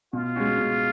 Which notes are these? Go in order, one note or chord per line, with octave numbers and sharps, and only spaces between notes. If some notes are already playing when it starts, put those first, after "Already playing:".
B2 F4
G#3 C#4 F#4
B2